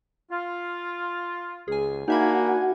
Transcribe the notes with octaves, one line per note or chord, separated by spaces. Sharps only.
F4
C#2 G#4 G#5
A#3 D4 D#4 F#4 E5 F#5 G#5 B5